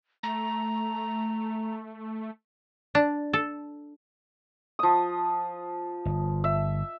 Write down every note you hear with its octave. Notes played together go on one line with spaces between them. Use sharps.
A3 A#5
D4
A4
F3 D#6
G1
E5